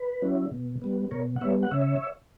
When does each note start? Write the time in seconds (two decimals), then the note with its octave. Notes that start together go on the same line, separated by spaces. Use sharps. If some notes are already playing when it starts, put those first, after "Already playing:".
Already playing: B4
0.22 F#3 C#4 E4
0.52 B2
0.82 G3 B3
1.11 B2 A#4 C#5
1.36 F#5
1.41 G3 B3 C#5 E5
1.63 F#5
1.71 C#3 C#5 E5